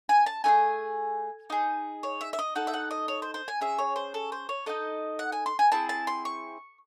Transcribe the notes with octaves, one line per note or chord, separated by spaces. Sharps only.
G#5
A5
A3 D#4 G#4 G#5
D#4 G#4
C#5
E5
E5
D#5
D#4 A4 F#5
E5
F#5
D#5
C#5
C5
C5
G#5
C#4 G#4 E5
C#5
C5
A4
C5
C#5
D#4 A4 D#5
F#5
G#5
C6
G#5
C4 E4 G#4 A5
A5
C6
C#6